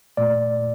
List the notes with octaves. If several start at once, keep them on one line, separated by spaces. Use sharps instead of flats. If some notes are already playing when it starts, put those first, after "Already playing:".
A#2 A3 D5